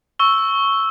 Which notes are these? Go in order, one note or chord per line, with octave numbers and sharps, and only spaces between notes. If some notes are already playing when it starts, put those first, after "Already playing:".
C#6 E6 G7